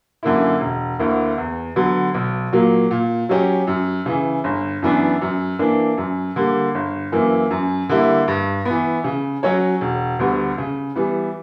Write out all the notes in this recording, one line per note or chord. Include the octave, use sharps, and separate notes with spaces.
F#2 D3 A#3 E4
E1
D2 D3 A#3 E4
E2
D3 F#3 B3
B1
A#2 F#3 A#3
A#2
F#3 C#4 G4
F#2
C#3 E3
G1
F#2 E3 B3 D4
F#2
E3 A#3 D4
F#2
D3 G3 A#3
G1
F#2 E3 A#3
F#2
D3 G3 A#3 E4
G2
B3
E3
C#3
F#3 C#4 F#4 C#5
E1
D2 D3 G3 B3
C#3
E3 G3 B3